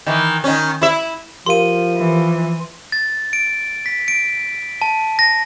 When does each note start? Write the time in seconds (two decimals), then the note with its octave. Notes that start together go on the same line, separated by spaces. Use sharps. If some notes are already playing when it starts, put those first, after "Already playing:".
0.06 D#3 E3
0.44 D#3 C#4
0.82 E4 E5
1.46 F3 G4 A#4 F5 C6 D#7
1.97 E3
2.92 A6
3.33 D7
3.86 B6
4.08 D7
4.82 A5
5.19 A#6